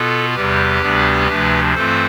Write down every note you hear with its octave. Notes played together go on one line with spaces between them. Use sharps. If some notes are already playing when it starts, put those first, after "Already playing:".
Already playing: B2 B3 F4 A4
E2 C3 G3 G4 B4
D2 C3 G3 B3 D4
D2 C3 F3 A3 D4
G2 E3 A3 C4 F4 A4 C5